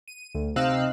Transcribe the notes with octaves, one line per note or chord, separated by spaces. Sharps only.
D#7
D2
C3 C4 D#4 F5 E6 F#6